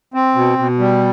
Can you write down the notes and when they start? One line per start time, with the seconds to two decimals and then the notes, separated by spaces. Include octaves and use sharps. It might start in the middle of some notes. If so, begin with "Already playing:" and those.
0.14 C4
0.35 B2
0.58 B2
0.79 G3